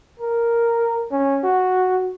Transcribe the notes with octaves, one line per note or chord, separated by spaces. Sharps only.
A#4
C#4
F#4